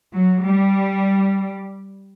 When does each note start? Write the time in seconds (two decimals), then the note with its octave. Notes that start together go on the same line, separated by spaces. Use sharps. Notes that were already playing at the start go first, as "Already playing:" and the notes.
0.13 F#3
0.44 G3